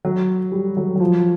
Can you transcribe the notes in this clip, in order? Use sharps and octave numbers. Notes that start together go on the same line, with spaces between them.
F#3
G3
F#3
F#3
F3